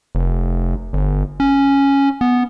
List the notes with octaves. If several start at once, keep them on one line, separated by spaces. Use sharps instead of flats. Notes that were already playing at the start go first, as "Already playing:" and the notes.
F1
G1
C#4
B3